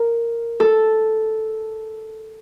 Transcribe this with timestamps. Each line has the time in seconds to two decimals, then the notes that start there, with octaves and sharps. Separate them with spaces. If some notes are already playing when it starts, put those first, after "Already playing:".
Already playing: A#4
0.60 A4